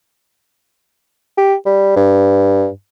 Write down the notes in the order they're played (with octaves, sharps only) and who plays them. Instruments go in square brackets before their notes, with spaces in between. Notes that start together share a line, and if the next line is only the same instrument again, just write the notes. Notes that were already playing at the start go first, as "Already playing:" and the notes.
[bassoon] G4
G3
G2